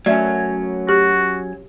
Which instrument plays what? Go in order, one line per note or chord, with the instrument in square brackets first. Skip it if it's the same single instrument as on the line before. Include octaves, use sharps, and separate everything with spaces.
[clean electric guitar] F#3 C#4 [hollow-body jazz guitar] A3 E5 [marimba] D5
[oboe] F#4 [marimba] G4